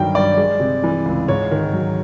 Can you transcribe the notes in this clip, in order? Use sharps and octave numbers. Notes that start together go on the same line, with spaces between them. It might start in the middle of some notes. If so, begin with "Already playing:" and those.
Already playing: G2 D#3 F#3 G5
G2 D5
G#3
C3
E3
C#2
G#2 C#5
D#3
F#3